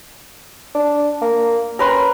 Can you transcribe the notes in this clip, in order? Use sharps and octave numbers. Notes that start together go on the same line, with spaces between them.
D4
A#3
C#4 A#4 B4 C6